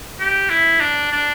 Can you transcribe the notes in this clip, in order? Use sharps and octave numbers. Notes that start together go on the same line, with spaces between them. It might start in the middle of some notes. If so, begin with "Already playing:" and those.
G4
E4
D4
D4